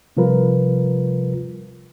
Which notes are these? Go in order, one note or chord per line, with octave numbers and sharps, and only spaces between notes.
C3 F3 G3 F4 A#4 B4